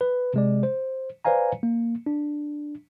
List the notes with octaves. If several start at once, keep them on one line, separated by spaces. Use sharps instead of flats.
B4
C3 G#3 D5
C5
B4 C5 D5 F5 G#5 A#5
A#3
D4